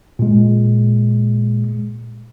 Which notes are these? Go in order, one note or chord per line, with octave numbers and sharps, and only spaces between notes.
A#2 G#3